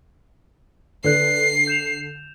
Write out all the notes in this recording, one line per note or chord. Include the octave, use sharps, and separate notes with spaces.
D3 B4 D5 F#6 C7
G6 E7 F7